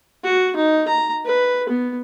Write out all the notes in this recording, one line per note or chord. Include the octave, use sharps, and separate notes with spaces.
F#4
D#4
A#5
B4
B3